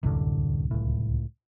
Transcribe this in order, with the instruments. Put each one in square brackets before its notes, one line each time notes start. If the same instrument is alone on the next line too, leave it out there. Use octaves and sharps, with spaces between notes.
[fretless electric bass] D1 C2 [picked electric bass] F#2 D3
[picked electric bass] C#2 A2